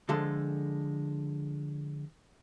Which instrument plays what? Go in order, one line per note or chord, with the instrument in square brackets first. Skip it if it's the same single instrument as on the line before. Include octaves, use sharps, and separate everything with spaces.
[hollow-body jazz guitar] D3 F3 G#3 A4